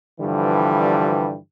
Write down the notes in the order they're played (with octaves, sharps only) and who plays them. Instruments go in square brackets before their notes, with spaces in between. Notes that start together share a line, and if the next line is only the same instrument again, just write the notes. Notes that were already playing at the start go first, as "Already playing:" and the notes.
[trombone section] G2 D3 E3 F3 G3